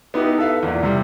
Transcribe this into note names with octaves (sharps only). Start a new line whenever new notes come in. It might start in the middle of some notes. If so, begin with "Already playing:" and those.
B3 D#4 E4 G4
A4 B4 E5 F5
E2 A#2
C3 G3